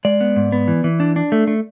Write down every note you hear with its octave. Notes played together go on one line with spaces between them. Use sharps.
G#3 D5
B3
G#2
B3
E3
E3
D4
D4
A3
A3